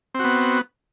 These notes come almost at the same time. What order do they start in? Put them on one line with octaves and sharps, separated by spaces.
C4 F#4 B3